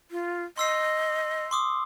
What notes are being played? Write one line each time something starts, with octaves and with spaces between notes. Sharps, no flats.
F4
D#5 C6 E6 C7
C6 D6 D#6